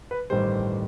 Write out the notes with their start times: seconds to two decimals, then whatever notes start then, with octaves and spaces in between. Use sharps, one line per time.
0.11 B4
0.30 A1 G2 D#3 G3 C5